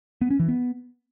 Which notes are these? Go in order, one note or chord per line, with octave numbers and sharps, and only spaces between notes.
B3
C#4
E3
B3